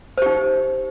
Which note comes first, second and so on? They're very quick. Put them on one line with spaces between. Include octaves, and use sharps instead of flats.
C5 G4 D#4